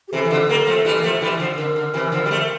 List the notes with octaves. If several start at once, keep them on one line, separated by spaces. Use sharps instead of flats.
G4
C3 E3 A4
E3
D3 F3
G3 A#3
F3 A3
E3 G3
A#3
F3 A3
E3 G3
D3 F3
D3 A#4
D3
C3 E3
D3 F3
G3
F3 A3